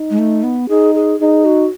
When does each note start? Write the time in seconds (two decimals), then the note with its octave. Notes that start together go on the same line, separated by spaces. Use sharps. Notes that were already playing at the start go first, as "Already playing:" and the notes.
Already playing: D#4
0.11 G#3
0.19 A3
0.43 B3
0.69 D#4 G#4
0.95 G#4
1.20 D#4 G#4
1.45 F#4